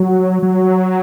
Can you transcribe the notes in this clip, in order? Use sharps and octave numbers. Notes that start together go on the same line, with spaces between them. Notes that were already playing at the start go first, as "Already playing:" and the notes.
Already playing: F#3
F#3